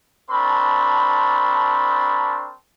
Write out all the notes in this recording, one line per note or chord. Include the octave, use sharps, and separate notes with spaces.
C4 D4 A#4 A5 B5 C#6